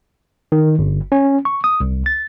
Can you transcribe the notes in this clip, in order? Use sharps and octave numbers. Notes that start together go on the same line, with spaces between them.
D#3
G1
C#4
C#6
D#6
C2
A6